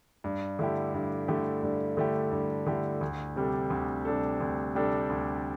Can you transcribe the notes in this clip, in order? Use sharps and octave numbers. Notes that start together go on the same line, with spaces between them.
G2
D3 A3 E4 G4
G2
D3 A3 E4 G4
G2
D3 A3 E4 G4
G2
D3 A3 E4 G4
D2
C3 G3 D4 A4
D2
C3 G3 D4 A4
D2
C3 G3 D4 A4
D2